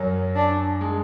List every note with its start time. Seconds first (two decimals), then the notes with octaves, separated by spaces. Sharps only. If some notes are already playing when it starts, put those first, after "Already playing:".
Already playing: F#2 F#3
0.35 D4
0.81 G#3